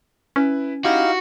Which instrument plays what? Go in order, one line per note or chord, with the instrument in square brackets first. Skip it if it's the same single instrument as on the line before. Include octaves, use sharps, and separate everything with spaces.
[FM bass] C#4 [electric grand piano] E4 B4
[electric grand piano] D#4 E4 G4 [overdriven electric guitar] F#4 [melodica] F5